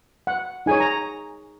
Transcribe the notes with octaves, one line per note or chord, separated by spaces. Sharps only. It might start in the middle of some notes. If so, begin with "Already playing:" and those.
F#5
D#4 G#4 C#5 G#5
A#5